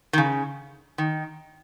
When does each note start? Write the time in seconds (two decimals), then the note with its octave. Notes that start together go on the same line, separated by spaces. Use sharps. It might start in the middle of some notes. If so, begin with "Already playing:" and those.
0.13 D#3
0.18 C#3
0.98 D#3